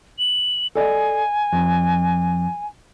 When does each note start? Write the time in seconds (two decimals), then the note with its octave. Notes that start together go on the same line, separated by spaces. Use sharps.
0.19 F#7
0.76 A4 D5 D#5 G#5
1.53 F2